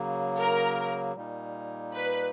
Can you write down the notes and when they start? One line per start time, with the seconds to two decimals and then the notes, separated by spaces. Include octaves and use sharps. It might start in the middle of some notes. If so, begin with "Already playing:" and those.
Already playing: C#3 F#3 A#3
0.38 A#4
1.16 A#2 G3 A#3 D#4
1.93 B4